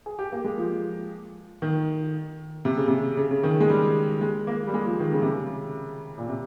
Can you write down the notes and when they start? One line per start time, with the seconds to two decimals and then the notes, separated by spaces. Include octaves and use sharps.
0.06 G#4
0.19 G4
0.32 A#3
0.44 G#3
0.58 F3
1.62 D#3
2.65 C3
2.77 C#3
2.88 C3
3.17 C#3
3.31 C#3
3.43 D#3
3.60 G#3
3.70 G3
4.21 G#3
4.47 A#3
4.67 G3
4.74 G#3
4.86 F3
5.00 D#3
5.12 C#3
5.22 C3
5.32 C#3
6.18 A#2
6.29 C3